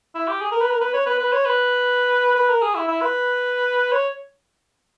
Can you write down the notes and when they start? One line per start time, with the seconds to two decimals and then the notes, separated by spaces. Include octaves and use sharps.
0.15 E4
0.28 G4
0.41 G#4
0.52 A#4
0.61 B4
0.71 A#4
0.81 B4
0.94 C#5
1.06 B4
1.20 B4
1.32 C#5
1.45 B4
2.36 B4
2.49 A#4
2.62 G#4
2.75 E4
2.88 E4
3.02 B4
3.92 C#5